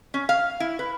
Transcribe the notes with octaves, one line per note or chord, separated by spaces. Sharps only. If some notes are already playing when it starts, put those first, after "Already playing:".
C#4
F5
E4
B4